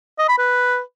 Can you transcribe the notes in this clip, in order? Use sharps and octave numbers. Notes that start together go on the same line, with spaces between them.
D#5
B5
B4